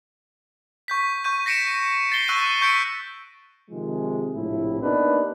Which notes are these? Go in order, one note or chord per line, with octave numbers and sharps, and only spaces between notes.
C#6 G6 B6
C#6 G6 D#7
A#6 B6 C#7 D7 E7
A6 C7 G7
C#6 E6 F#6 C7 D#7
C#6 G6 B6 C#7 D7
C3 D#3 F3 G#3
A#1 A2 C3 F3 E4
A#3 B3 D4 D#4 G4 B4